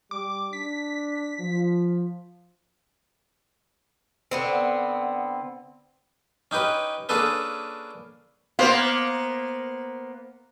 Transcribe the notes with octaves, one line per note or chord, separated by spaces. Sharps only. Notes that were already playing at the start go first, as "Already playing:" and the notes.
G3 D6
D4 B6
F3
D3 B3 C4
C#4 D#4 G4 B4
A#3 C#4 D4 G#4 A4 B4
A#3 B3 C5 F5